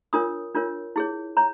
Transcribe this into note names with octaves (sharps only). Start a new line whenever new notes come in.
D4 F4 A#4 C#5 D#6
D4 F4 A#4 C#5
E4 G#4 C#5
C#5 A#5